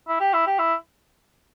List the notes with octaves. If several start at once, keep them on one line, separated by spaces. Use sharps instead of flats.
E4
G4
E4
G4
E4